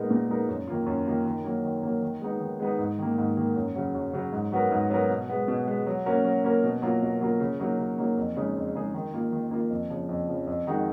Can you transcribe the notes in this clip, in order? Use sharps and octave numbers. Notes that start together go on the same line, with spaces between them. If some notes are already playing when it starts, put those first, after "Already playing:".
Already playing: A#2 G#3 B3 D#4 A#4
A#2
G#3 B3 D#4 A#4
F#2
D#3 A#3 F4
F#2
D#3 A#3 F4
D#3
F#3 A#3
D#3
F#3 A#3
D#3
G#3 B3 D#4
D#3
G#3 B3 D#4
G#2
D#3 A#3
G#2
D#3 A#3
F#2
C#3 F#3
F#2
C#3 F#3
G#2
F#3 B3 F#4 A#4
G#2
F#3 B3 F#4 A#4
B2
G#3 B3
B2
G#3 B3
F#3
A#3 C#4 F#4 A#4
F#3
A#3 C#4 F#4 A#4
B2
F#3 A#3 F4 A#4
B2
F#3 A#3 F4 A#4
C#3
F#3 A#3 D#4
C#3
F#3 A#3 D#4
F2
C#3 G#3 D#4 G#4
F2
C#3 G#3 D#4 G#4
D#3
A#3 F4
D#3
A#3 F4
F2
C#3 F3
F2
C#3 F3
F2
D#3 G#3 D#4 F#4